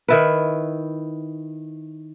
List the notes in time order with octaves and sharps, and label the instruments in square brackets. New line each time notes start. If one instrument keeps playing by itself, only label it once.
[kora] D#3 E4 B4